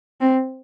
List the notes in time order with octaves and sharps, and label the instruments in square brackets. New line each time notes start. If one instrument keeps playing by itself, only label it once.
[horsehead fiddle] C4